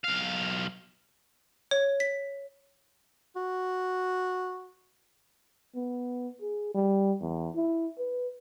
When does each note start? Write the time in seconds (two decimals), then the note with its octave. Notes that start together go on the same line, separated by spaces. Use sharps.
0.04 B1 F5
1.71 C#5
2.00 B6
3.36 F#4
5.75 B3
6.42 G#4
6.74 G3
7.21 E2
7.55 E4
7.98 B4